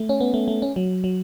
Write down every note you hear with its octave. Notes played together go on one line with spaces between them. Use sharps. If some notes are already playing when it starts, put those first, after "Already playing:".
Already playing: A3
C#4
B3
A3
A3
C#4
F#3
F#3